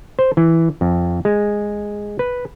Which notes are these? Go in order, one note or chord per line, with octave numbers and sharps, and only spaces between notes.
C5
E3
F2
G#3
B4